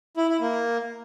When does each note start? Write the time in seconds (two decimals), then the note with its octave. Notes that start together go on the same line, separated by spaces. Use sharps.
0.17 E4
0.29 E4
0.40 A#3